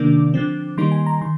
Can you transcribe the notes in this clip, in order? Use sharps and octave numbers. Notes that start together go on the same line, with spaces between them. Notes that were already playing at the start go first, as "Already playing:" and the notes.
Already playing: C3 D#3 A#3 D4 D6
D3 F3 C4
D#3 G3 A#3 D#4 C6
G#5
A#5
D#3 C6